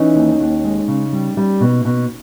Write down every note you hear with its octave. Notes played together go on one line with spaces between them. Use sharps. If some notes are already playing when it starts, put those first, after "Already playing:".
Already playing: E3 C#4 D#4
D#2
D#2
G#3
C#3
G3
G3
B2
B2